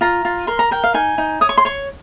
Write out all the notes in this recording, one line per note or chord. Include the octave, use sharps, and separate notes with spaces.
F4 A#5
F4
A#4 C6
A#5
A#4 G5
F5
D#4 G#5
D#4
C#5 D#6
C#6
C6
C#5 C#6